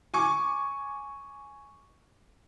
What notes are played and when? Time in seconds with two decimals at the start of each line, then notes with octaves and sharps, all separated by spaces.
0.14 G#5 C#6 D6